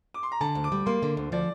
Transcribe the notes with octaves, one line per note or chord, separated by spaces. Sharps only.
D6
C6
A#5
D3 A5
D2
D6
G3
A#3 C6
D3
D2
F3 D5